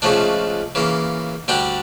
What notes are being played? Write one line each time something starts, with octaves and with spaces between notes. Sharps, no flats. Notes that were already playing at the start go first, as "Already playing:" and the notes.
C#2 C#3 F3 A3 D4
C#3 E3 A#3
D2 D3 G3 D4 G4